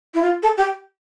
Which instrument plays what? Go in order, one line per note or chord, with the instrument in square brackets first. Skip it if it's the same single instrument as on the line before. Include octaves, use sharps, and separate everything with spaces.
[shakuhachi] E4
F4
A4
G4